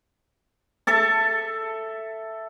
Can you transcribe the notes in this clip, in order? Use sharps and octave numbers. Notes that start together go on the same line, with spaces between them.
A4 E5 A5